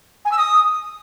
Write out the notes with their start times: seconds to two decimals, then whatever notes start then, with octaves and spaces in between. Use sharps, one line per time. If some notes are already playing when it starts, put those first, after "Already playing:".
0.25 G#5
0.31 E6
0.38 D#6